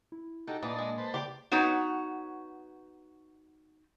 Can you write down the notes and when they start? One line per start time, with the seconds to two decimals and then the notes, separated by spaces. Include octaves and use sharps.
0.12 E4
0.47 D#4 F#4 G4 A4
0.63 A#2 E3 A#3 D4 D#5 A5
0.79 G#3
0.98 B4 C5 A5
1.14 C#3 G4 D5
1.51 B3 D#4 F#4 B4 C#5